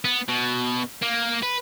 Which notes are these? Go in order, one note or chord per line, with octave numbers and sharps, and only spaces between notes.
B3
B2
A#3
B4